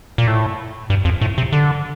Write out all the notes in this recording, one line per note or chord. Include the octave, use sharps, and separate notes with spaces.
A#2
A2
G2
F2
A2
C3
D3